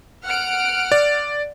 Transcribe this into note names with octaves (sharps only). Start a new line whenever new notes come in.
F#5 F6 D7
D5